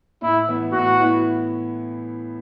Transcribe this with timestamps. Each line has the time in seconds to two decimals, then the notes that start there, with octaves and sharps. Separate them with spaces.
0.22 A2 E4
0.48 E3 B3 E4
0.72 A2 F#4
0.99 E3 B3 E4